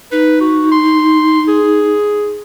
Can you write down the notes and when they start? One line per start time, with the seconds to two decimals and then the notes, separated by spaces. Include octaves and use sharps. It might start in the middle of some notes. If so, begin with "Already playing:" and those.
0.12 D#4 B4
0.40 F#4
0.71 C6
1.48 G#4